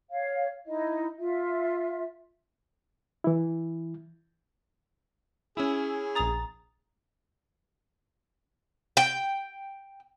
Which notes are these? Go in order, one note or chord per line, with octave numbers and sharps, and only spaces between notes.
C#5 F5
D#4 E4 D#5
F4 E5
E3 E4
C#4 E4 G#4 E6
A#1 A#5 D#6 A6 F7
G5